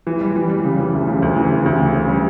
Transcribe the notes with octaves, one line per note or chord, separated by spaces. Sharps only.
E3
G3
E3
G3
C#3
E3
D2
C#3
D2
E3
C#3
D2
C#3
C#3
G3